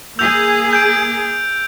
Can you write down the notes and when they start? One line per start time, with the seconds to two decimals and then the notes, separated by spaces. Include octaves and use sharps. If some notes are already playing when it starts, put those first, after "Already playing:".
0.19 A#3 G#4 E6 G6 F7
0.73 G6 D7